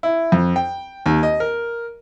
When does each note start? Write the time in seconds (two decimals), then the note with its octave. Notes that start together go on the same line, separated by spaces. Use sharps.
0.03 E4
0.32 F2
0.56 G5
1.06 D#2
1.23 D#5
1.40 A#4